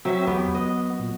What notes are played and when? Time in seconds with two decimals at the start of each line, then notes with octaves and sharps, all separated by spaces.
0.05 F#3 C4 E5
0.27 E2 B3 G4
0.55 B3 D#5
0.99 A#2